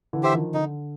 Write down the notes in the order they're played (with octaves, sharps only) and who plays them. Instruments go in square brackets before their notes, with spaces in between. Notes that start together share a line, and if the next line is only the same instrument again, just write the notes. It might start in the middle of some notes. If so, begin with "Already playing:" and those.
[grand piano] D3 E3
[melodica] G4 C5 E5
[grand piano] D#3 F3
[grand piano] D3 [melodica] D#4